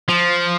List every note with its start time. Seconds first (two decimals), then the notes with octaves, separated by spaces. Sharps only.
0.08 F3